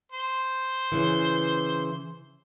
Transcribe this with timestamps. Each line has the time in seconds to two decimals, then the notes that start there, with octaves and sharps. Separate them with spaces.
0.12 C5
0.92 C#3 E3